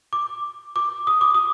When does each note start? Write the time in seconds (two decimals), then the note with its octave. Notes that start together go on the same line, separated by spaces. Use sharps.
0.13 D6
0.76 D6
1.07 D#6
1.21 D6
1.34 D#6